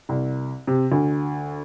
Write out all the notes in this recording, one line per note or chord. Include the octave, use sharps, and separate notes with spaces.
C2
C3
D2